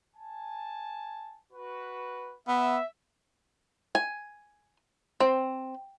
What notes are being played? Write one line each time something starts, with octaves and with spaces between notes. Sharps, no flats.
G#5 A5
F#4 B4
B3 E5
G#5
C4